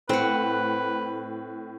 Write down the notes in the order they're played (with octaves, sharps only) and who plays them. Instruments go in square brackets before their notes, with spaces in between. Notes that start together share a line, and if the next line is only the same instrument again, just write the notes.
[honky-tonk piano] A2 [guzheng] C4 F#5 [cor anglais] B4